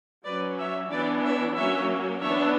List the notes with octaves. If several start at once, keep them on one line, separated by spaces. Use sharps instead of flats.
F#3 C#4 B4 D5
C#5 E5
E3 B3 D4 B4 D5
C#5 E5
F#3 A#3 C#4 C#5 E5
E3 B3 D4 C#5 E5